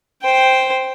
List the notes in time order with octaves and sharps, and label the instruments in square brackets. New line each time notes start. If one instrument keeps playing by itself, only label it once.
[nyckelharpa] C5 G5